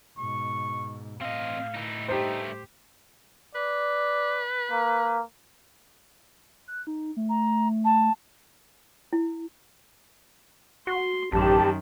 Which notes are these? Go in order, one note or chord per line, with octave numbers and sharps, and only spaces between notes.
G#2 B2 C#6
A2 C4 D#5 F5
E3 D#4
G2 A3 D#4 G4 C5
B4 D5
A#3
F#6
D#4
A3
A#5
A5
E4
F#4 C6
A1 F#2 D#3 G4 A5